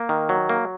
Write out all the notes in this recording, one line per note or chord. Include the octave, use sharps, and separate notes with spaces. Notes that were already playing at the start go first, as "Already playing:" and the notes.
Already playing: A#3
D#3
F#3
A#3